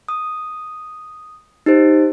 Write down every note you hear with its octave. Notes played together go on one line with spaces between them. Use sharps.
D#6
D#4 G4 C5